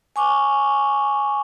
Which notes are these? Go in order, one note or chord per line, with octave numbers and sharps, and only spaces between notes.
G#5 C#6 D6